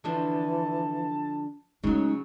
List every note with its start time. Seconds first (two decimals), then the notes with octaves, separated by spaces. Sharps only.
0.04 D3 E3 F3 D4 A5
1.84 C#3 F#3 G#3 A3 C#4 D#4